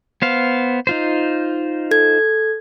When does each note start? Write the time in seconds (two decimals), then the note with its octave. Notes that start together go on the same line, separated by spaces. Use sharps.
0.22 B3 C5 F5
0.87 D#4 F4 C5
1.91 A4 G#6